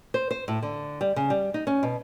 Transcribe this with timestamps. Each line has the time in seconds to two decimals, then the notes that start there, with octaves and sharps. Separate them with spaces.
0.14 C5
0.31 C5
0.48 A2
0.62 D3
1.01 G3
1.16 C#3
1.30 G3
1.54 D#4
1.67 C#4
1.83 B2